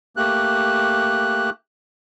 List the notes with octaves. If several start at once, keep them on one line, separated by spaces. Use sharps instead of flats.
A3 A#3 G4 F#6